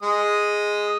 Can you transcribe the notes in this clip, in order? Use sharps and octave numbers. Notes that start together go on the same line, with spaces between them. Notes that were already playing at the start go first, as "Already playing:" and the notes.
G#3 D#6